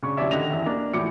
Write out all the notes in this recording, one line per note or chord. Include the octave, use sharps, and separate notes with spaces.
C#3 D4 C#6
A#1 D#2 C#4 C#5 D5 E5
D3 D#3 D#5 A#6 F7
E2 E5
A#3 D4
E2 A2 F3 D6 C#7